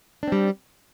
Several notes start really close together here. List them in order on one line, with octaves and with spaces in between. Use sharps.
D4 C4 G3